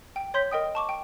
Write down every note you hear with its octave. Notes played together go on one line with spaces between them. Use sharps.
G5
C#5 C6 G6 B6
A#4 D#5 G5 D#6
A5 C#6 D6
G5